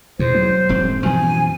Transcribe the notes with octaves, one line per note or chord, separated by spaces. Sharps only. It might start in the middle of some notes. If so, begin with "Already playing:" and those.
E2 B2 C5
F#3
E1 G#2 C4
F#2 B2 E3 F3 G#5